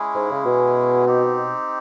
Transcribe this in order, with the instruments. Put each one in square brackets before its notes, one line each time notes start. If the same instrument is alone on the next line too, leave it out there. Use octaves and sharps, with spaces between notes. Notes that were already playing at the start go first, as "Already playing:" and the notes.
Already playing: [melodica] G#3 C#4 E4 G#4
[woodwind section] G#2
C#3
B2
[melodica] C4 D#4 G4